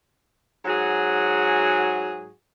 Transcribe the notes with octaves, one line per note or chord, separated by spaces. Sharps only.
G#2 F#3 F#4 G#4